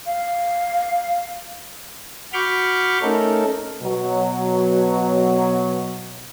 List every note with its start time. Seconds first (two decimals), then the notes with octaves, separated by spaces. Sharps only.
0.06 F5
2.33 F#4 B5 C#6 D6 F6 G6
3.02 A3 C#4 D#4 A4 A#4
3.82 B2 F#3